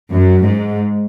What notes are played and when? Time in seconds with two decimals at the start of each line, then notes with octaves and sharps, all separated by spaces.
0.12 F#2
0.47 G#2